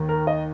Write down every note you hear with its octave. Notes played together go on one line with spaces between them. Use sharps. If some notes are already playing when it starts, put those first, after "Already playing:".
Already playing: D#2 D#3
A#4
D#5